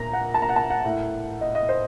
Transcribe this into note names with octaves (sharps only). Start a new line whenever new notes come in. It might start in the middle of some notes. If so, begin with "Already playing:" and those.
Already playing: A#2 A#5
F#5
A5
A#5
F#5
A5
F#5
A2
D#5
D#5
C5